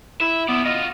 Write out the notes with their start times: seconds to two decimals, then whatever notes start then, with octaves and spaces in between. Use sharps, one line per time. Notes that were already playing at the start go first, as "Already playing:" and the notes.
0.21 E4 E5
0.48 B3 E4 D5
0.65 F4 F#4 D#5